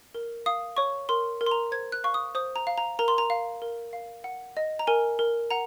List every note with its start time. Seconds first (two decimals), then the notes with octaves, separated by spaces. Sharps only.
0.15 A#4
0.46 F5 D#6
0.77 C#5 C#6
1.09 A#4 C6
1.41 A#4
1.46 C6
1.51 A#5
1.72 C5 G#6
1.92 F#6
2.04 F5 C#6
2.14 D#6
2.35 C5 D#6
2.56 A#5
2.67 F5
2.78 A#5
2.99 A#4 A#5
3.08 C6
3.18 A#5
3.30 F5
3.62 A#4
3.93 F5
4.24 F#5
4.57 D#5
4.79 A#5
4.87 A#4 G#5
5.19 A#4
5.51 F#5 A#5